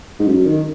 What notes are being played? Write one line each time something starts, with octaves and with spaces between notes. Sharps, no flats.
G#2
F#2
D#3